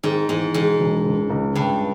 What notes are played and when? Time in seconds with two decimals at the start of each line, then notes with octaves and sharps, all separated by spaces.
0.03 G#2 D#3
0.29 E2 G#2
0.54 E1 G#2
0.80 E1
1.05 C#2
1.30 C#2
1.55 C#2 G2